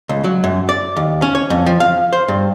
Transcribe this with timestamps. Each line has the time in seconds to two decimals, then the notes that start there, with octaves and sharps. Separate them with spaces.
0.09 C#2
0.24 F#3
0.44 F#2
0.69 D5
0.96 D#2
1.22 C#4
1.35 C#5
1.50 F2
1.66 F3
1.80 F5
2.13 C5
2.28 G2